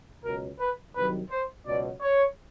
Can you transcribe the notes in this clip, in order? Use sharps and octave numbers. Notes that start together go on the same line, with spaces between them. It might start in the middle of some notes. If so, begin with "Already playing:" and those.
C#2 B2 F#3 A#4
B4
C2 C3 D#3 F#3 B4
C5
C#2 B2 F#3 D5
C#5